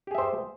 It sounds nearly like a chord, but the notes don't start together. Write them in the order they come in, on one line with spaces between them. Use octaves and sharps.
G4 G#4 E5 C5